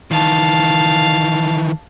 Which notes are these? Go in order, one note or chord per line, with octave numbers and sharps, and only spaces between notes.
D#3 E3 F5 A5